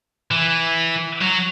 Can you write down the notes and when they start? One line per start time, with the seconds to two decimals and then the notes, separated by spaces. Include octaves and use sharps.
0.31 E3
1.22 F#3